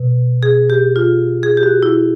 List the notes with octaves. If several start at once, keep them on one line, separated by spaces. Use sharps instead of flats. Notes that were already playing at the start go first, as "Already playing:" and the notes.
Already playing: B2
G#4
G4
F4
G#4
G4
F#4
E4